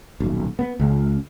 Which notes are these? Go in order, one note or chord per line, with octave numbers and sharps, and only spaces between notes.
D#1 B1
B3
C#2